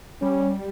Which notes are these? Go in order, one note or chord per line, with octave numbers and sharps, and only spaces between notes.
G3 C#4